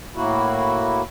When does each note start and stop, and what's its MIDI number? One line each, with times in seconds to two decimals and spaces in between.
0.15 1.02 45
0.15 1.02 58
0.15 1.02 64
0.15 1.02 66